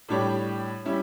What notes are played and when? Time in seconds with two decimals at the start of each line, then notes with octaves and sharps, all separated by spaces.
0.09 A2 G3 D4 G4 C#5
0.85 G3 C#4 E4